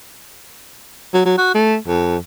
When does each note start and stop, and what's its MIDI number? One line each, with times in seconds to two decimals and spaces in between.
1.14 1.24 54
1.25 1.36 54
1.38 1.53 66
1.54 1.77 57
1.87 2.17 41